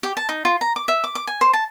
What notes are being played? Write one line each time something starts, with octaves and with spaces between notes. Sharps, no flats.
G4
A5
D#4
F4
A#5
D6
E5
D6
D6
G#5
C5
A5